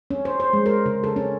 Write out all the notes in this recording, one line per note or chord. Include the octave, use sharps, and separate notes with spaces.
C#4
C5
C5
G#3
A#4
C#3
A4
C#4